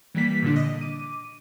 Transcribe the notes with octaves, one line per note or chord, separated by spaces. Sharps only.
E3 G3 A#3 B6
A#2 D3 D4
D#5
D6 D#7